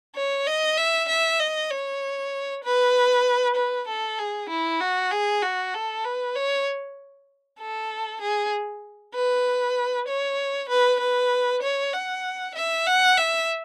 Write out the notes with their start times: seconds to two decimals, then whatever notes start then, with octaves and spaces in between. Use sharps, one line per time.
0.16 C#5
0.47 D#5
0.77 E5
1.09 E5
1.40 D#5
1.71 C#5
2.64 B4
3.56 B4
3.88 A4
4.19 G#4
4.50 E4
4.80 F#4
5.12 G#4
5.42 F#4
5.74 A4
6.05 B4
6.35 C#5
7.60 A4
8.21 G#4
9.15 B4
10.08 C#5
10.70 B4
11.00 B4
11.62 C#5
11.93 F#5
12.55 E5
12.86 F#5
13.17 E5